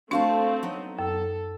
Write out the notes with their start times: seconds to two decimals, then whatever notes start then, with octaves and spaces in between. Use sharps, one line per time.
0.11 A3 C4 D4 F#4 F5 A5 C#6
0.63 F#3 B3 D#4
0.99 F#2 A4